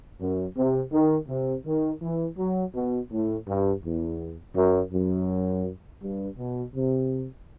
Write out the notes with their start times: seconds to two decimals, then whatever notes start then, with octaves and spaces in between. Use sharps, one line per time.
0.20 F#2
0.56 C3
0.93 D#3
1.28 C3
1.66 D#3
2.02 E3
2.38 F#3
2.75 B2
3.12 A2
3.47 G2
3.84 E2
4.56 F#2
4.93 F#2
6.02 G2
6.38 B2
6.75 C3